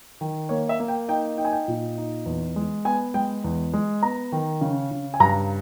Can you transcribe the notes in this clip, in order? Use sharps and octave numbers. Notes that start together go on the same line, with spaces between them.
D#3
A#3 C#5
E5
A#3
G5
D#4 G5
D#4 G5
G#5
G5
A#2
D#4
E2
G#3
B3 G#5
G#3 G5
E2
G#3
B3 A#5
D#3
C#3
C#3
G#5
G2 A#5